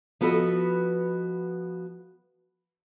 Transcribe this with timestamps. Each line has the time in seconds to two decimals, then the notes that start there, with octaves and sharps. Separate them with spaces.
0.21 F3 B3 F#4 A4 B4 D#5